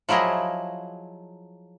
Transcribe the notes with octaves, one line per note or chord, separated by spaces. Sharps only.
F3 F#3 E4 G#4 D#5